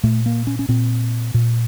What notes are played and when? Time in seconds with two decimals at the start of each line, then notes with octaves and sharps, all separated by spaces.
0.03 A#2 A3
0.26 A#3
0.47 C#4
0.59 C#4
0.69 A#2 C4
1.34 A#2